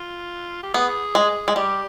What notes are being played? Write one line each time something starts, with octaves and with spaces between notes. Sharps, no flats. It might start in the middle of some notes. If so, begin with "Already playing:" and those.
Already playing: F4
G4
B3 G#4
G#3
G#3
G3 G4